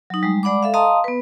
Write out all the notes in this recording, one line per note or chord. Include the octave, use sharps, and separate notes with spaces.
F#3 D#4
G3 G#3
G#3 D5 F#5 B5 D6
A4 E5 F5
D#5 F5 A5 A#5 C6 D#6
B3 B4